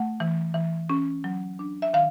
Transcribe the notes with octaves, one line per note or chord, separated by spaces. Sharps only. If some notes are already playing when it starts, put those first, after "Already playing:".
Already playing: A3 F#5
E3
E3
C#4
F#3
D4
E5
D#3 F5